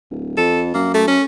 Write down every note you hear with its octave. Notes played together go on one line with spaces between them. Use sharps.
D1
F2 A4
F#2 A#3
A3
C#4